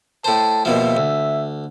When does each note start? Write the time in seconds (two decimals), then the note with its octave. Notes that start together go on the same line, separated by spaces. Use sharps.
0.24 A2 C5 A5
0.65 D#2 B2 F3 E5
0.97 D2